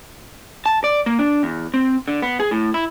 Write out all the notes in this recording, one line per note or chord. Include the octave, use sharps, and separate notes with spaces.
A5
D5
A#3
D4
E2
C4
D3
B3
G#4
A2
E4